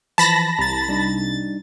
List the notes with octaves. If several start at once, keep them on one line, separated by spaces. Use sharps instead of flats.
E3 F3 A5 B5 A#6
C2 A#5 A6
G3 D4 D#4